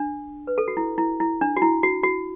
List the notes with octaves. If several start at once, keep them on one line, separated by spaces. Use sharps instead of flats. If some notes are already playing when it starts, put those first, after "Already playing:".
Already playing: D4
B4
A4
F#4
E4
E4
E4
D4
F#4
E4
F#4
F#4